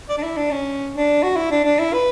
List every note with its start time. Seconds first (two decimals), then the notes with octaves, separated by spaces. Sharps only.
0.09 D5
0.18 D4
0.23 E4
0.37 D4
0.51 C#4
0.95 D4
1.23 F#4
1.36 E4
1.51 D4
1.65 D4
1.80 E4
1.93 B4